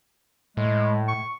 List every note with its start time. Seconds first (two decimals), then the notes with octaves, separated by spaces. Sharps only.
0.57 A2 G#3
1.08 C#6